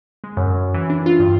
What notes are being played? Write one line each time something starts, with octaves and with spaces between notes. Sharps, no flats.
G#3
F#2
E3
D4
F4
G2